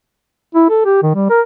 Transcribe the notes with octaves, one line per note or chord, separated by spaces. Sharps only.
E4
A4
G4
D#3
G3
A#4